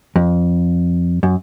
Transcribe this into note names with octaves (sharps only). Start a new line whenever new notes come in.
F2
F#2